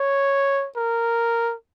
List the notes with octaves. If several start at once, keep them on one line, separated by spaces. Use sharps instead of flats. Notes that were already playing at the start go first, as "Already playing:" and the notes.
Already playing: C#5
A#4